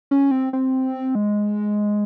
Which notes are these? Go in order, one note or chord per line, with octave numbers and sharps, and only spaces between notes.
C#4
C4
C4
G#3